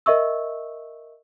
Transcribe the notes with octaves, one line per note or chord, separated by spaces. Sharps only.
A#4 D#5 E5 C#6 E6